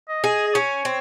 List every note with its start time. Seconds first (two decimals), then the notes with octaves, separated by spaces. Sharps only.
0.08 D#5
0.24 G#4
0.47 D#5
0.54 C#4 C#5
0.85 C4